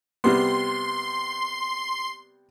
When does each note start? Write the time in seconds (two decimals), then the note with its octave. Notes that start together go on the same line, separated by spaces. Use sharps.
0.24 C3 G3 B3 C6